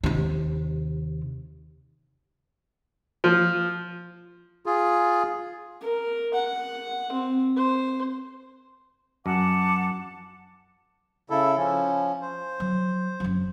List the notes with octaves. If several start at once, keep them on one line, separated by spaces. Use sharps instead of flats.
D#2 C3
F3
F4 G#4
A#4
F#5
C4
C5
F#2 F#5 A5 D6
C#3 E4 A4
F3 C#4
C5
F#3
F#1 F#3